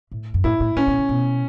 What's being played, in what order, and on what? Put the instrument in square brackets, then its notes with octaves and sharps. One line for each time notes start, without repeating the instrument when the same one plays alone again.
[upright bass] A2
F#2
[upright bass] A2 [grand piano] E4
[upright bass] A2
[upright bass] A2 [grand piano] C#4
[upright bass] B2
C#3
B2